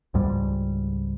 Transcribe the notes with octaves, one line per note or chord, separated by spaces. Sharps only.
C#2 G#2 G3